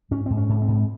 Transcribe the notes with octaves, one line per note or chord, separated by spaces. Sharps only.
G#2 C#4
G#2 C4
C#4
G#2
C4
G#2